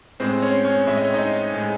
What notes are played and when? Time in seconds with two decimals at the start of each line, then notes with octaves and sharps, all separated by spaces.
0.20 A2 G#3 C4 C5
0.42 C#4 C#5
0.65 C#4 C#5
0.87 A2 G#3 E5
0.96 D#5
1.05 C#5
1.14 D#4 D#5
1.54 A2 G#3